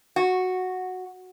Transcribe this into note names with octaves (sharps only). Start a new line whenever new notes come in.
F#4